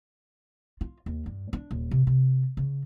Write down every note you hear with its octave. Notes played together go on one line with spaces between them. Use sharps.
F4
D#2
G2
D4
D#1
C3
C3
C#3